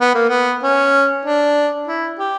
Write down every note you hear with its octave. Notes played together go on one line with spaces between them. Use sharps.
B3
A#3
B3
C#4
D4
E4
G4